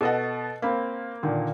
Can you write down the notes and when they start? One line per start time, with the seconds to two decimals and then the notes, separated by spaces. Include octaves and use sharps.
0.01 B2 A4 D#5 F#5
0.62 A#3 C4 B5
1.23 A#2 D3 D#3